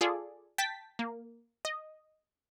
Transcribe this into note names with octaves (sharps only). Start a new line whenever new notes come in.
F4 G#4 A4 D5
G5 A5 A6 B6
A#3
D#5